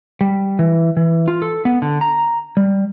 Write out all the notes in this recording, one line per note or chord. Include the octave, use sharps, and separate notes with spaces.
G3
E3
E3
F4
A4
B3
D3
A#5
G3